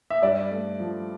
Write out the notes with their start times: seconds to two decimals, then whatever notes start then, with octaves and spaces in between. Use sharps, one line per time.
0.10 E5
0.22 G2 D5
0.51 A3
0.80 F3